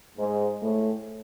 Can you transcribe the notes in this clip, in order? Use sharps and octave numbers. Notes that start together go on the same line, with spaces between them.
G#2
A2